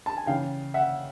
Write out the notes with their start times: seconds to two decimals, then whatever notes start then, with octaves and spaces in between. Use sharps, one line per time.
0.06 A5
0.17 G#5
0.26 C#3 E3 F5 G5
0.74 E5 F#5